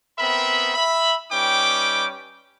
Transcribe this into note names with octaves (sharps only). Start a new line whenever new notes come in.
B3 C4 A#4 E5 B5
E5 B5
G3 C#4 D#4 B4 G5 D6